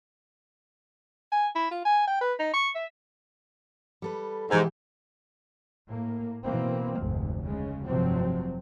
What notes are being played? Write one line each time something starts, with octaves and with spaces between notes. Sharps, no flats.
G#5
E4
F4
G#5
G5
B4
D#4
C#6
E5
G3 A4 B4
G#2 B2 E3 G4
A2 A#3
B2 E3 A#3 C4
F1 D2 G#2
C#3 G#3
F1 G2 C3 F3 F#3 C4